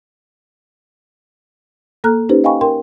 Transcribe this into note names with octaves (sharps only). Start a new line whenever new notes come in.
A#3 A4 A#5 F6 F#6
C#4 D#4 G4 B4 C5
D#5 F5 G5 G#5 B5 C#6
A#4 G5 C6